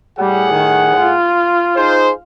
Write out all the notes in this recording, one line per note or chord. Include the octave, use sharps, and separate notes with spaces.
A2 G3 G#4 F#5
D#3
F4
D#4 G#4 C5